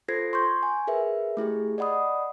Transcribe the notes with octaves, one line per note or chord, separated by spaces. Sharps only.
F4 A4 C5 G#6 A#6 C7
C6 C#6 G6
G#5
G#4 A#4 B4 E5
A3 E4 G4 G#4
D5 D#5 F#5 B5 D#6